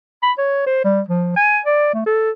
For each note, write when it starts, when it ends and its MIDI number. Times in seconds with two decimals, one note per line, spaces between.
0.23 0.32 83
0.38 0.62 73
0.67 0.83 72
0.84 1.01 55
1.09 1.33 53
1.36 1.59 80
1.66 1.94 74
1.94 2.03 57
2.06 2.31 69